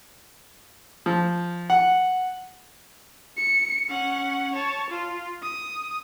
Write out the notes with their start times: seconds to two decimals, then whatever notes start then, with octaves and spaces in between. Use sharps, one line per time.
1.06 F3
1.70 F#5
3.37 C#7
3.89 C#4 F#5
4.53 C#5 A5
4.91 F4
5.42 D#6